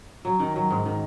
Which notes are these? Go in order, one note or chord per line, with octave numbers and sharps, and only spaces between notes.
F#3
D#3
F#3
G#2
D#3